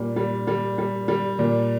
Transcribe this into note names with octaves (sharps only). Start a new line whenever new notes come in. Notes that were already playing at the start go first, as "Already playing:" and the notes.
Already playing: A#2 G3
G3
G3
G3
G3
A#2